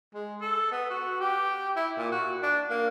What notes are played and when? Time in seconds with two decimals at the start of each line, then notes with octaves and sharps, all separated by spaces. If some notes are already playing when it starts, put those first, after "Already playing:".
0.14 G#3
0.41 A4
0.72 B3
0.90 F#4
1.20 G4
1.76 E4
1.97 A#2
2.12 F#4
2.43 D4
2.70 A#3